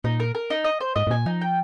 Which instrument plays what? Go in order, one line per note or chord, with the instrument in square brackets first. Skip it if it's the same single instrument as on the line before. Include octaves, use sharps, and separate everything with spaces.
[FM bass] A#2 [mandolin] D#4
[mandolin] A#4
A#4
D#4
D#5
C5
[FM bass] G#2 [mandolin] D#5
[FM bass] G#2
[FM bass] A#2 [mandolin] G#5
[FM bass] F3 [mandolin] D#4
[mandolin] G5